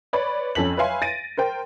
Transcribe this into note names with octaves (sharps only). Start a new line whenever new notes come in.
B4 C#5 D5 B5
F2 C#4 A4 B6 F#7
B4 C#5 E5 F5 G#5 C6
A6 A#6 D7 D#7
A#4 C5 G5